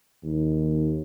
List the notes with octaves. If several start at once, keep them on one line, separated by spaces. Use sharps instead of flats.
D#2